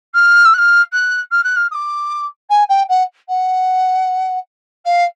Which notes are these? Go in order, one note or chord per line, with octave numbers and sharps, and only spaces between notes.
F6
E6
F#6
F6
F#6
F6
F#6
F6
D#6
D6
G#5
G5
F#5
F#5
F5